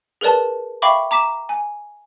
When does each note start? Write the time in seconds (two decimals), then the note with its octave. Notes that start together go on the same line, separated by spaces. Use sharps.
0.21 G#4 A#4 B4 D5 A5
0.82 E5 F5 G5 B5 C#6 D6
1.11 A#5 D6 B6 E7
1.49 G#5